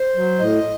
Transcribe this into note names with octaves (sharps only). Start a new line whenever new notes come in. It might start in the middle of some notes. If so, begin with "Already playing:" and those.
Already playing: C5
F#3
A2 D#5